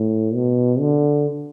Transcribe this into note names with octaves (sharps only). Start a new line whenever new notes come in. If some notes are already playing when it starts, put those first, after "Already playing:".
Already playing: A2
B2
D3